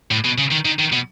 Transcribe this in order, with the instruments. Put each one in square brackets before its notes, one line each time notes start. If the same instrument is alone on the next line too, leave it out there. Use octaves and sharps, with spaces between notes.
[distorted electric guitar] A2
B2
C#3
D#3
D#3
D#3
B2